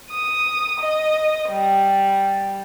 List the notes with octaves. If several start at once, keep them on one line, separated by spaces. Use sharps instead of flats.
D#6
D#5
G3